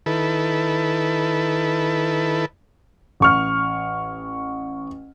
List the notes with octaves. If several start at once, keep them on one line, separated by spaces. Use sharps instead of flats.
D#3 E4 A4 B4
A1 C#6 F6